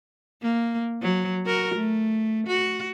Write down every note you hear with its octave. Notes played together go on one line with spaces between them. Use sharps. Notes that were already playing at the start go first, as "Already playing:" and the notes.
A#3
F#3
F#4 A#4
A3
F#4